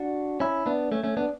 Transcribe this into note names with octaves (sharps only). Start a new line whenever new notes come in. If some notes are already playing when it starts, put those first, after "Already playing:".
Already playing: D4 F#4
C#4 E4
B3 D4
A3 C#4
A3 C#4
B3 D4